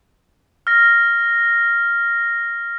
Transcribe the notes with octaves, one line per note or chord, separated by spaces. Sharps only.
F6 A#6